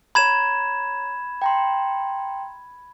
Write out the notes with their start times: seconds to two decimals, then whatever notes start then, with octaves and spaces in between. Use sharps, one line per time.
0.15 C#5 A#5 B5 G#6 E7
1.42 G5 A#5 C6